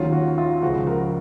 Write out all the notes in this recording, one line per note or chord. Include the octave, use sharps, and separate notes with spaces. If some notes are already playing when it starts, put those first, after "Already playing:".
Already playing: D#2 D#3 F#3 C#4 F4
F#4
F4
C#2 C#3 F3 F#4
F#4 A#4